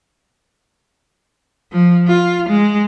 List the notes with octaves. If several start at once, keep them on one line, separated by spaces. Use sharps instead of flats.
F3
F4
G#3